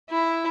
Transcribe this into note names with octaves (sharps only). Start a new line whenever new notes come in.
E4